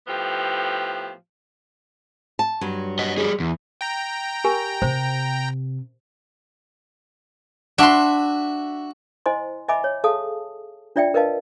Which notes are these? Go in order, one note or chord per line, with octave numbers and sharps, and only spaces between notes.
A2 F3 B3 G4
A5
G2 F#3
D#5 F#5
G3 G#4
E2
G5 A#5
G4 A#4 G#5
C3 C5
D4 F#4 E5 C6
E4 C5 D#5 G#5 C6
D#5 E5 G#5 B5 D6
C#5
G#4 A4 F5 A5 D#6
D4 F4 D5 E5 G5
A#4 B4 D#5 F5 A5